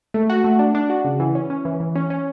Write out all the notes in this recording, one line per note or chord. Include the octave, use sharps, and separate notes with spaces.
A3
F#4
A3
D4
D4
F#4
C#3
E3
C#4
C#4
E3
E3
C#4
C#4